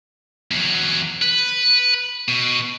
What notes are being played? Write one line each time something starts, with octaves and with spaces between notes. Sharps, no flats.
E2 F#3
B4
B2